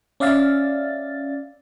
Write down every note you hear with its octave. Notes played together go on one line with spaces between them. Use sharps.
C#4 D5 E5 F5 A6